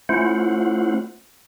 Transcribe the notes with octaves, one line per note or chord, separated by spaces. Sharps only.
A3 C#4 E4 F4 C5 F#5